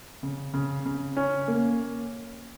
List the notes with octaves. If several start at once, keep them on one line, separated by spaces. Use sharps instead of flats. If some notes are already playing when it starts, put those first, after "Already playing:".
C#3
C#3
C#3
C#4
A#3